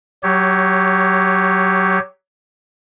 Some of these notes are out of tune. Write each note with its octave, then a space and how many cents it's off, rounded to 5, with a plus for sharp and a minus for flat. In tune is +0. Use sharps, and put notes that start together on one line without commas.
F#3 +20 G4 +0 C#5 +0